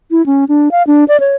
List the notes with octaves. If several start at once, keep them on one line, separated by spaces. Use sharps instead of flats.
E4
C#4
D4
F5
D4
D5
C#5